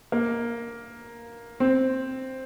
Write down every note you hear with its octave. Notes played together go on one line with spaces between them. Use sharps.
A#3
C4